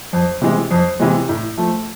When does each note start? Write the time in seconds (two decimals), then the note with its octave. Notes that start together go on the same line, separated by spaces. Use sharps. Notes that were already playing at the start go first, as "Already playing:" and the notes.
0.13 F2
0.42 C3 E3 G#3
0.71 F2
1.00 C3 E3 G#3
1.29 A2
1.58 F3 A3